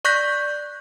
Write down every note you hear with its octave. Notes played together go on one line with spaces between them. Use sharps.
D5 C#6 F#6 G6 A#6 B6